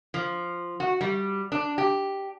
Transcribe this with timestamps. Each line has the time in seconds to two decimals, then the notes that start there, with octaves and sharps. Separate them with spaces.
0.14 F3
0.80 F#4
1.01 G3
1.52 D4
1.78 G4